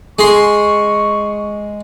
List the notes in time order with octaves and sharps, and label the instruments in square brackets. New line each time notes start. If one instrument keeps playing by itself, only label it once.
[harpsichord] G#3 C6 [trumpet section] C#6